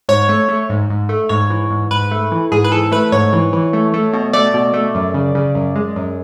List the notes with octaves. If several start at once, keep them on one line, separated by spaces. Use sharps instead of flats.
G#2 C#5
A3
A3
G#2
G#2
A3
G#2 C#5
E3
G#2
G#2 B4
A3
E3
G#2 G#4
B4
E3 A4
A3 B4
G#2 C#5
E3
E3
A3
A3
B2
A3 D5
B2
A3
F#2
C#3
C#3
F#2
G#3
F#2